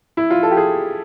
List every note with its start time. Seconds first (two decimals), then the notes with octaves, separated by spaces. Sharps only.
0.17 E4
0.30 F4
0.43 A4
0.51 G4
0.57 G#4